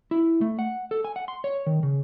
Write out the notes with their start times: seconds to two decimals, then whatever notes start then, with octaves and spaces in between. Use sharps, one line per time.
0.11 E4
0.41 A3
0.59 F#5
0.91 A4
1.05 G#5
1.16 F#5
1.28 C6
1.44 C#5
1.66 D#3
1.83 C#3